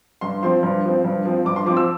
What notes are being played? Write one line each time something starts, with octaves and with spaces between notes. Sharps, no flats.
G2 C6
F3 C4 C6
G2
F3 C4
G2
F3 C4
G2 D6
C6
F3 C4 D6
E6